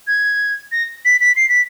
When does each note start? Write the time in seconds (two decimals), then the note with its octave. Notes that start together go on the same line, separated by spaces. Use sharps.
0.07 G#6
0.72 A#6
1.05 B6
1.21 B6
1.36 C7
1.49 B6